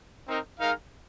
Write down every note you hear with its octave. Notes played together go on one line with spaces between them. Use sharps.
C4 D#4 A#4
G#3 D#4 A#4 F5